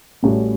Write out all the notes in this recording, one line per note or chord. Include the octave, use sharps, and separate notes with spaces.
A1 A2 G3 C#4 F#4